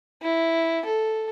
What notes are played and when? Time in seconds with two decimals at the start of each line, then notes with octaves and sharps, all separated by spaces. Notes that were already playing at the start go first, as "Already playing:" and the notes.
0.22 E4
0.85 A4